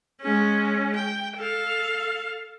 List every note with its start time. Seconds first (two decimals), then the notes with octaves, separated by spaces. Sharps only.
0.21 G#3 C#4
0.95 G5
1.37 A4 F5